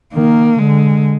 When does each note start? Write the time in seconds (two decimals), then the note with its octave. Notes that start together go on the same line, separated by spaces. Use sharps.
0.14 D#3 A#3
0.59 D3 G#3